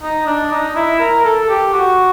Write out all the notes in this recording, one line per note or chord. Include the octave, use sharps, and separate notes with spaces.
D#4
D4
D#4
E4
A#4
A4
G4
F#4